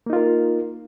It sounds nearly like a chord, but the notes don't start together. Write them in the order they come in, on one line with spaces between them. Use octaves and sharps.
A#3 D#4 F4 A#4